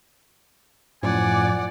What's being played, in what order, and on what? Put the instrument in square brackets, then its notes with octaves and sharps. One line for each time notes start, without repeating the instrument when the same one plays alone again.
[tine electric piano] F#2 A2 F3 [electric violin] D5 F#5 [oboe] G#5